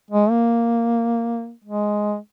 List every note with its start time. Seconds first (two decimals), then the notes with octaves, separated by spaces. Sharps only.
0.11 G#3
0.30 A#3
1.64 G#3